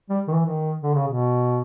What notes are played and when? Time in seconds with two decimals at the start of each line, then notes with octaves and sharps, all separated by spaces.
0.10 G3
0.28 D#3
0.33 E3
0.46 D#3
0.83 D3
0.94 C#3
1.07 B2